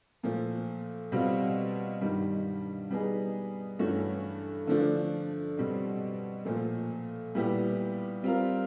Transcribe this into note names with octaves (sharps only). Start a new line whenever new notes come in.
A#2 F3 A3
B2 G3 C4 F4
G2 D#3 G3
G3 B3 D#4 G#4
G2 E3 A3 C#4 F#4
D3 F3 A3 D4
B2 G3 C4
A#2 F3 A3
A#2 G3 B3 E4 G4
G3 C4 F4 A#4